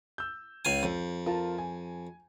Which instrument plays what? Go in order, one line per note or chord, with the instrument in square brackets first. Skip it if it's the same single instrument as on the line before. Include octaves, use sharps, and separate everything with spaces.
[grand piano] E6 G6
[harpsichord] C#2 F5 G#5
F2
[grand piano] F4 A#4 A5
G#5